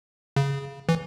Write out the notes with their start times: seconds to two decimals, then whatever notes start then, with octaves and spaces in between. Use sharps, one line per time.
0.36 C#3
0.89 E3